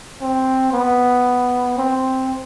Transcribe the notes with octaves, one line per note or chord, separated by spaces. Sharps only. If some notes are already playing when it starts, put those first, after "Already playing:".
C4
B3
C4